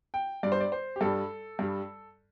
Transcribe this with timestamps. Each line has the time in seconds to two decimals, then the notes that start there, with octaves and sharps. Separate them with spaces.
0.14 G5
0.43 G2 G3 D5
0.52 C5
0.60 D5
0.72 C5
0.96 G4
1.01 G2 G3 A4
1.59 G2 G3